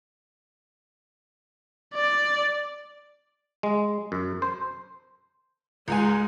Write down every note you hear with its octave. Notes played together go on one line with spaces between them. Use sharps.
D5
G#3
F#2
C5
C#2 G#2 G#3 G#5